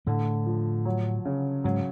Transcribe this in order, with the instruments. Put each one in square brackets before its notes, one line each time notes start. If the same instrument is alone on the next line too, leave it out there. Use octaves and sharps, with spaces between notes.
[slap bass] A2 A3 [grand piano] D3
[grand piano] F3
F#3
C#3
[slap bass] G#2 G#3 [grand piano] F#3